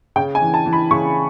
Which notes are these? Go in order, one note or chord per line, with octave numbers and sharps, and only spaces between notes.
C#3 G5
G#5
E3
A5
E3
B5
C#3 C#6